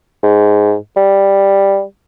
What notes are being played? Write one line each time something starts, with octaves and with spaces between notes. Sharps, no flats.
G#2
G3